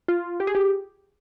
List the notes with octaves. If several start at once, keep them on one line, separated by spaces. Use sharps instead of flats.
F4
G4
G#4
G4